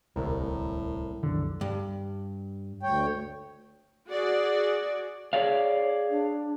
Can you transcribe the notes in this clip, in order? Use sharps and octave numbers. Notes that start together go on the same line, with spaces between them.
D1 C2 A2 A#4
C2 F#2 D3 D#3
G2
D2 C#5 G5
F#4 G#4 D5
G#4 C#5 D5 F5
D4